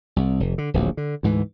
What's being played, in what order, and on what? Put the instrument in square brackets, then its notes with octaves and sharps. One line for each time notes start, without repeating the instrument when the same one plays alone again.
[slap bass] C2
F1
D3
D1 A#1 D#2 F#3
D3
D2 G#2 E3